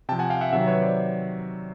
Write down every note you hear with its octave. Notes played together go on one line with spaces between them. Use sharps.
C3 F3 G5 A5
F#5 G#5
F5 G5
E5 F#5
C3 D#3 F#3 E5 F#5
B4 C#5
C5 D5